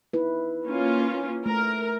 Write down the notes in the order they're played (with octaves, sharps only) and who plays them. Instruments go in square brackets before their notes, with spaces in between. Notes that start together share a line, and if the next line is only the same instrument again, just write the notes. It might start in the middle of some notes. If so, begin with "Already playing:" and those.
[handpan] D#4 E4 B4
[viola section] A#3 C#4 F4
[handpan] A3 [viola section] A#4